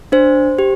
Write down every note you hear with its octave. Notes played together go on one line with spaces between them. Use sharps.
D4 C5
G4